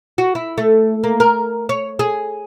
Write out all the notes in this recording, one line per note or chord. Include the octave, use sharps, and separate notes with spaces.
F#4
E4
A3
A#3
A#4
C#5
G#4